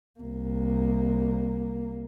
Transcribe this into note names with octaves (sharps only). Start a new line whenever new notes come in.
C2 A#3